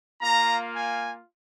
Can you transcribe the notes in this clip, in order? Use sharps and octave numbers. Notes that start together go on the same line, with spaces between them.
A#3 F4 A#5
G#5